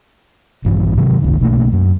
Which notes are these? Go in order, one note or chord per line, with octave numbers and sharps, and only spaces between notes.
A#1 G2 E3
C3 D#3 F#3
G1 C#2 D#3
B1 B2 A3 A#3
F#2